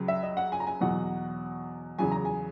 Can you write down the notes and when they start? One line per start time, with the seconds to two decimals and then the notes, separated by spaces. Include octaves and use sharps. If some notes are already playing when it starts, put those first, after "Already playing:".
Already playing: C#2 C#3 F#3
0.08 E5
0.23 D#5
0.37 F#5
0.52 G#5
0.60 A#5
0.67 G#5
0.81 E2 B2 F#3 F#5
1.98 E2 C#3 F#3 G#5
2.12 A#5
2.25 G#5